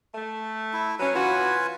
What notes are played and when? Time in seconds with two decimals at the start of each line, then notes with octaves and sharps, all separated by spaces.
0.14 A3
0.73 E4
0.99 F#3 C#4 B4
1.14 E3 F4 F#4 B4 G#5